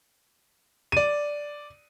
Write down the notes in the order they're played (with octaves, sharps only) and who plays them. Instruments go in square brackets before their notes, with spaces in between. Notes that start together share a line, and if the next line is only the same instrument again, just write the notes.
[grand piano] D5 D#7